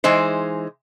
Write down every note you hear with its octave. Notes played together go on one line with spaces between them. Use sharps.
E3 G#3 D#4 C5